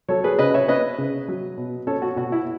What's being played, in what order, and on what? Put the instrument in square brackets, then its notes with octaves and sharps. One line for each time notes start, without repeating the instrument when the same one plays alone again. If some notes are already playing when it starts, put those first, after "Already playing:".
[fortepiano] F#3 A4 C#5
G#4 B4
C#3 B4 D#5
C#5 E5
C#4 B4 D#5
C#3
F#3
B2
C#4 A4 C#5
F#4
B2 F#4
E4